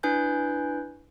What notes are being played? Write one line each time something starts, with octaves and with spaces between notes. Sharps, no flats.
D4 E4 B4 G#5 F#6 G6